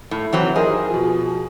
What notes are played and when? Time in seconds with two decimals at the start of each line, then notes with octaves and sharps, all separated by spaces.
0.11 A2
0.33 E3 F#3 C4
0.56 D#4 G#4 A#4 C5
0.90 B2 F3